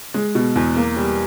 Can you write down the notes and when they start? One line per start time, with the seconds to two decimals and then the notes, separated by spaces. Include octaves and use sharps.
0.14 G#3
0.35 B2
0.56 E2
0.76 A#3
0.96 G3